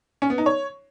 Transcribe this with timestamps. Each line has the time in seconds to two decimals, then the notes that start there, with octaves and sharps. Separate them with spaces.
0.22 C#4
0.30 B3
0.38 D#4
0.46 C#5